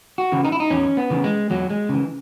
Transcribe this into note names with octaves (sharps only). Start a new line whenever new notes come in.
F#4
C#3 E3
D#4
E4
D#4
E2 C#4
B3
C#3 E3
G#3
E2 F#3
G#3
C#3 E3